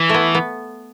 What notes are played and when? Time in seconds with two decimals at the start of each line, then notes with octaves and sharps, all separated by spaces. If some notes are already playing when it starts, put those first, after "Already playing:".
Already playing: E3
0.09 A3 B3
0.35 B3